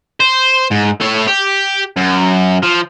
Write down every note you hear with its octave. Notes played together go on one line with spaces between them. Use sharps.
C5
G#2
A3 C#5
G4
F#2
F3